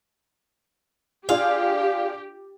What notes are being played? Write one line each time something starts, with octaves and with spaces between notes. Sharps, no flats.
D4 F4 G4 G#4 F5